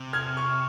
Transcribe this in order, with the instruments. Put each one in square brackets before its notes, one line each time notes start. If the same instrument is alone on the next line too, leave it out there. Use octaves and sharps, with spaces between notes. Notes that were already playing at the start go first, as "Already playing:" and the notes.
Already playing: [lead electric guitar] C3
[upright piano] F6 G#6
C#6 F6